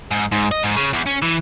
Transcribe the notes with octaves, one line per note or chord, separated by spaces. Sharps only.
G#2
G#2
D#5
G#2
C#3
E2
C#4
E3